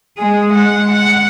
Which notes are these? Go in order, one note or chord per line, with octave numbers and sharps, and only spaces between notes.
G#3 G#4
G#3 F#5
F#5